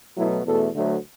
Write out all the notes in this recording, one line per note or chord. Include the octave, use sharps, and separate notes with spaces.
B2 F#3 A3 E4
E2 B2 A3 A4
D2 D3 F#3 A3